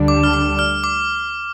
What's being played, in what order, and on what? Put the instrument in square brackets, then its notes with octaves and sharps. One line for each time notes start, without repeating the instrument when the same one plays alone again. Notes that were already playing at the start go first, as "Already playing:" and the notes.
Already playing: [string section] D2 D3 G3 D4
[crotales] D6
F6
D6
F6
D6